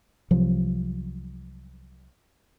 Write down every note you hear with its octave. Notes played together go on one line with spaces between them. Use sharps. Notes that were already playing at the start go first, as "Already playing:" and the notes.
C2 C3 F3 F#3